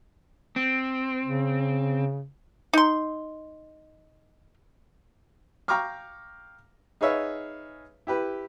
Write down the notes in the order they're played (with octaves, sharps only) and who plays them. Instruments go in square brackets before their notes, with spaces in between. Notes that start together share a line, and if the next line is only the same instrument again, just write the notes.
[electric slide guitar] C4
[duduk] C#3
[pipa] D#4 C6
[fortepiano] F5 G5 A#5 C#6 D6 F6
D#4 G#4 B4 C#5 E5 F5
E4 G4 B4